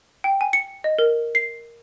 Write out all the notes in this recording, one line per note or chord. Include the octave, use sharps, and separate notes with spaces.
G5
G#5
C#7
D#5
A#4
C7